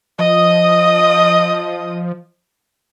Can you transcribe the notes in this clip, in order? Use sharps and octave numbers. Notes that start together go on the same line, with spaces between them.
F3 D#5 D#6